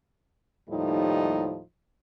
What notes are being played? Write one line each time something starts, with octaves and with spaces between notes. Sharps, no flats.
D#2 A2 F3 G3 D#4